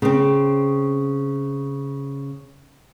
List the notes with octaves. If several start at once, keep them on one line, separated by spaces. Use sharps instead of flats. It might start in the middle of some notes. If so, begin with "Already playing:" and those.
C#3 C4